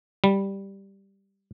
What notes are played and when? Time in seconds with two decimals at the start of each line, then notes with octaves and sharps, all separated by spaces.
0.24 G3